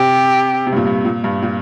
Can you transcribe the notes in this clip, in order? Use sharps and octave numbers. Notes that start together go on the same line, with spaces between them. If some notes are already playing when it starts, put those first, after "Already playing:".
Already playing: C3 G4
C3
G2
A#2
G2
A#2
G2
A#2